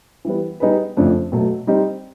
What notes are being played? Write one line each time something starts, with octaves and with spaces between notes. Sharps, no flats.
E3 G3 B3
G3 B3 D#4 G#4 B4
F2 C#3 F3 A3 D4
B2 F#3 A3
G3 C4 D#4 G4